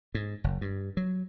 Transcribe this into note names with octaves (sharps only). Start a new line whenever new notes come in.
G#2
F#1
G2
F#3